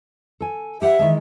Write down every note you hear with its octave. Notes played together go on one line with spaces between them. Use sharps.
A4 G#5
G4 C5 E5 F#5
D#3 E3 G#3